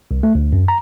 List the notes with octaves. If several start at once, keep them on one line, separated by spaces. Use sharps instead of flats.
C2
A3
D2
F#2
A#5